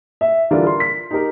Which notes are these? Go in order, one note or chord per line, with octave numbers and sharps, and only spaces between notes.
E5
D3 E3 G3 D4 F4 A#4
A#4 C6
B6
D#4 G4 A#4